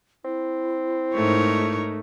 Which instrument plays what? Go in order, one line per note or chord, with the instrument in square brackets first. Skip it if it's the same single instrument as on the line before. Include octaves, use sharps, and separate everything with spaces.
[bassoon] C4 [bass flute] E4
[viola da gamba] G#2 A#4 C#5 [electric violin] A3 D#4